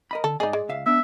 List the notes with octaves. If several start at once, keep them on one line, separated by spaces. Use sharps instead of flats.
A#4 D#5 B5
D3 A4
G#2 D#4 G#4 D5 D#5
G#3
C#2 E5 F5
B3 D4 E5